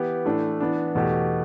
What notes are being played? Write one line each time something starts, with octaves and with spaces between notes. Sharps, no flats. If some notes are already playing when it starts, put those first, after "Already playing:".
Already playing: E3 B3 E4 G4
A2 E3 A3 D4
E3 B3 D4
E2 B2 A3 G4